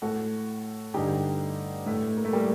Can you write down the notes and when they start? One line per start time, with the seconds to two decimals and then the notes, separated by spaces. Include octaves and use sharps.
0.02 A2 F#4 A4
0.94 G2 D3 D#4 G4
1.86 A2 A3
2.17 A#3
2.25 A3
2.33 G3 A#3